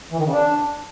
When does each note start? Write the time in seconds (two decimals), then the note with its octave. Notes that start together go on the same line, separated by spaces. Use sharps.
0.11 E3
0.18 D#3
0.25 C#3
0.32 D4